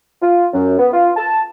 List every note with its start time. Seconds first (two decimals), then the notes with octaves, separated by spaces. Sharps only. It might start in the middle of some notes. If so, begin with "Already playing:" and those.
0.22 F4
0.53 F#2
0.79 B3
0.93 F4
1.16 A5